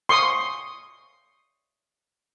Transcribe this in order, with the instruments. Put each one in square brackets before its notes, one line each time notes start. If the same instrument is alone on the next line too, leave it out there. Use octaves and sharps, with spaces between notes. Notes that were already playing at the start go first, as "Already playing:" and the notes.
[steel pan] C6 C#6 D#6